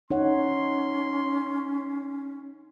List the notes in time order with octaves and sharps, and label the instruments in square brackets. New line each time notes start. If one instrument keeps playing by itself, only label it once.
[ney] C#4 [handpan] D#4 C#5 F#5 [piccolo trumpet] C6